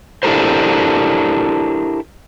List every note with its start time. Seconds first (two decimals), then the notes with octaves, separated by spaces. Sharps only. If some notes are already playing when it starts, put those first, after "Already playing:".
0.23 D4 E4 G4 A4 A#4 C5